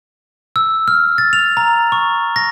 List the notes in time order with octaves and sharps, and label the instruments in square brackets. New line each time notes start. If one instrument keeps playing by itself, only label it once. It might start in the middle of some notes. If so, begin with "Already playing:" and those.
[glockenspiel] E6
F6
A6
F7
A#5
C#6
A#6